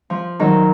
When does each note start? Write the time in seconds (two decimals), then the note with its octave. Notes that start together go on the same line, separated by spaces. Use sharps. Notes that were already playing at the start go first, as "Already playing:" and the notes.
0.10 F3
0.40 D#3 F#3